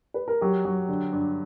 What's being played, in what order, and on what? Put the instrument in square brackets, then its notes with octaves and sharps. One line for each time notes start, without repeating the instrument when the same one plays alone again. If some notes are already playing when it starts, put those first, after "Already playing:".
[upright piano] B4
A#4
[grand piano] F#3 [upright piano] G4
[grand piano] F#3
D3
G2